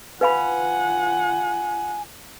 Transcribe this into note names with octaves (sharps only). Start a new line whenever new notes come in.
F4 B4 F5 F#5 G#5 B5